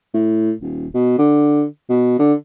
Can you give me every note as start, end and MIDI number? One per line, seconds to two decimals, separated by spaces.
0.14 0.52 45
0.62 0.87 27
0.94 1.16 47
1.18 1.64 50
1.89 2.17 47
2.19 2.33 50